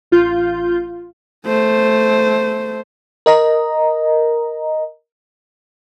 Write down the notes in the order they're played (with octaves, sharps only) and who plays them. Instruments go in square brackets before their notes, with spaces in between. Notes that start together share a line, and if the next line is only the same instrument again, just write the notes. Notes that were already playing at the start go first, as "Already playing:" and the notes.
[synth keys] A1 F4 G6
[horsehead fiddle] A3 C5
[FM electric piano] A#4 D#5 A#5